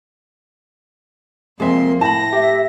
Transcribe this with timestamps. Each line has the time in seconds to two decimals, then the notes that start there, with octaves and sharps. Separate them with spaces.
1.60 C2 F2 G#3 A#3 C4 G#4 E5 C6
2.01 A2 E4 G5 A5 B5 A#6
2.33 G4 E5